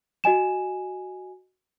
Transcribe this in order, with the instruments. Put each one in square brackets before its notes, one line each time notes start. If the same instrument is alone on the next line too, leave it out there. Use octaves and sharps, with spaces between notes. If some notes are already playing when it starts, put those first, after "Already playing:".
[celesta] F#4 D#5 G#5 E7